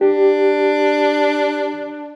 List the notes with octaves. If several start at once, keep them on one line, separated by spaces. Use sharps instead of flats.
D4 G4